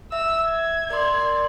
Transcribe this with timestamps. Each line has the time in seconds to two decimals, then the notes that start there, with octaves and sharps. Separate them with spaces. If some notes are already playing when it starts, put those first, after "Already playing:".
0.12 E5 E6
0.49 G#6
0.91 A#4 D5 C6